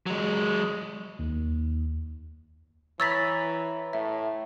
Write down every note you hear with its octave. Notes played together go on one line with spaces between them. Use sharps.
F#3 G#3
D#2
E3 C#5 A#5 B5 E6 A6 B6
A2 E5